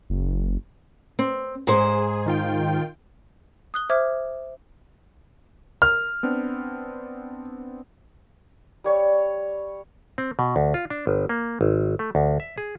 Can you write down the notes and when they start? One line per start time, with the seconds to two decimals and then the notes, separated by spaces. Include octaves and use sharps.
0.10 F#1
1.19 C4
1.67 G#2 G#4 C5
2.26 D#3 F4 G5
3.74 D#6 F#6 G7
3.90 C5 E5 D6 F6 G#6
5.82 A#4 F6
6.23 B3 C4 D4
8.84 G3 C#5 C#6
10.18 C4
10.39 B2
10.56 D2
10.74 F4
10.90 D4
11.07 G1
11.29 A#3
11.61 G#1
11.99 A3
12.15 D2
12.40 E5
12.58 G#4